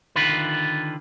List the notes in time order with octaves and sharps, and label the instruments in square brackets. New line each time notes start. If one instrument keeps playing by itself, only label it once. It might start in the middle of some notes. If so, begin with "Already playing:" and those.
[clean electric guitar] D3 D#3 F4 B4